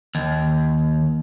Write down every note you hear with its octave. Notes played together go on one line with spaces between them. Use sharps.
D#2